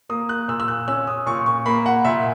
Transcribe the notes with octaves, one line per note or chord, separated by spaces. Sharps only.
A#3 D#6
F#6
A#2 E6
E6
F#6
C#4 E6
D#6
A#2 C#6
C#6
A#3 B5
F#5
A#2 E5